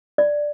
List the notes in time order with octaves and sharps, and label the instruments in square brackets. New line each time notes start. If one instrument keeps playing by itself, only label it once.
[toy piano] D5